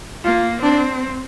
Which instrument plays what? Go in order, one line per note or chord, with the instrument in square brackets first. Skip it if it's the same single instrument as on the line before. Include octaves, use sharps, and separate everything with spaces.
[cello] A#3 [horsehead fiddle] F4
[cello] C4 [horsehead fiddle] D4